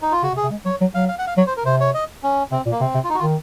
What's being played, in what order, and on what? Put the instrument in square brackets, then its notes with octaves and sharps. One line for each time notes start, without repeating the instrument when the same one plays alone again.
[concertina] D#4
F4
[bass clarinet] C#3 [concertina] F#4
[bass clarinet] C3
[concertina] G#4
[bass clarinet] C3
G#3
[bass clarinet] F#3 [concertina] C#5
[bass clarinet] F#3
[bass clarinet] F#3 [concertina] F5
[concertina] F5
F#5
F5
[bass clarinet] F#3 [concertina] C#5
[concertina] C5
A#4
[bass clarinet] C3 [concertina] C5
[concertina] C#5
D#5
C#4
[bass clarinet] C3 [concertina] C4
[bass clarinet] A#2
[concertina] A#3
[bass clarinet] C3 [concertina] C4
[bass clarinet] C3
[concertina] F4
D#4
F#4
F4
[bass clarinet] D#3